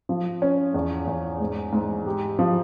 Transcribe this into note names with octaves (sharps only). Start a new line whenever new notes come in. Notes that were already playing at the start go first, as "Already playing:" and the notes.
F3
C#4
E2
E2
G#2
G#2
G4
F3